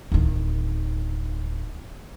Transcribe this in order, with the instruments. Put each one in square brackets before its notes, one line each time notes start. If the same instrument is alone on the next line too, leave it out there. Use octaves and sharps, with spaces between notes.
[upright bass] D1 D#3